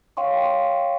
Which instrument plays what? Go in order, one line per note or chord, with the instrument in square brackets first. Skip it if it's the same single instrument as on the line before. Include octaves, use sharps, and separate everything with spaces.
[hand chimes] C#5 F5 G5 C6 C#6